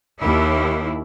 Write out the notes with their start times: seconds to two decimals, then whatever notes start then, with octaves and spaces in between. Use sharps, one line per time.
0.21 D#2 E4